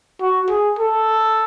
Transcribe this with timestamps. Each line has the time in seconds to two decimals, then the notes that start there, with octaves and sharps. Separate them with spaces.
0.21 F#4
0.50 G#4
0.79 A4